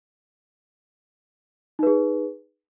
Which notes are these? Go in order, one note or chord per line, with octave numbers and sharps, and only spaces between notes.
D#4 G#4 B4